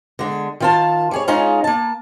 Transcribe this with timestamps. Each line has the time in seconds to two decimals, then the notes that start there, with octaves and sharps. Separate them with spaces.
0.19 D3 G#3
0.60 D#3 F4 A5
1.11 G3 G#4 C#5
1.27 G#3 C#4 D#4 F4 G#4 F5
1.64 A#3 A5